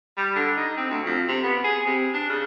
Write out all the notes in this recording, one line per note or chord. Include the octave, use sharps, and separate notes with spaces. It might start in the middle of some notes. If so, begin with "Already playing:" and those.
G3
D3
D#4
C4
D2
F2
C3
B3
G#4
C3
D4
C#3